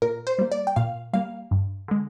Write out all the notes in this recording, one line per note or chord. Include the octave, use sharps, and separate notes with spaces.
A#2 A#4
C5
G3 A#3
D5
G5
A#2 F5
G3 A#3 F5
G2
D3 G#3